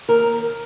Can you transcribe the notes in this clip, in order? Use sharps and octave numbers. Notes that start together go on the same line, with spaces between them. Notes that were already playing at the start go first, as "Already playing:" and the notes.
D#2 A#4